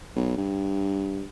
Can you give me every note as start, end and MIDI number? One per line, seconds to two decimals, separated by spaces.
0.16 0.35 35
0.37 1.24 43